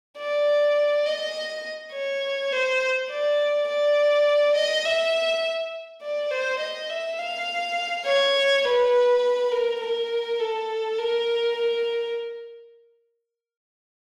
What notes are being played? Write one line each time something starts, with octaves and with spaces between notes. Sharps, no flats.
D5
D#5
C#5
C5
D5
D5
D#5
E5
D5
C5
D#5
E5
F5
C#5
B4
A#4
A#4
A4
A#4
A#4